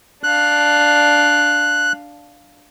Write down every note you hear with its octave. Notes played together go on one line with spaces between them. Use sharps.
D4 F5 F#6